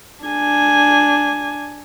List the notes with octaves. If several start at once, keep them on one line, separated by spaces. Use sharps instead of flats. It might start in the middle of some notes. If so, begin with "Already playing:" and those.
D4 G#5